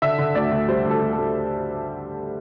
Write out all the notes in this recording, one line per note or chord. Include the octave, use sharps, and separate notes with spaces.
D3 E5
D3
D2 D5
D2
G3 C5
D2
A4
D2
A4
D2